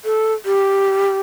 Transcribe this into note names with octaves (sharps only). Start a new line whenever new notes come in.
A4
G4